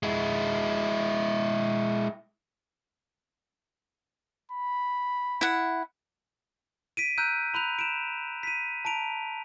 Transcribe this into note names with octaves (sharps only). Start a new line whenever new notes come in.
G#3 E4
B5
E4 F#5
B6 D7 D#7
A#5 E6 F#6 G6 D#7
A#5 B5 F#6 F7
D7 E7
B6 D#7
A5 A#5 D7 F7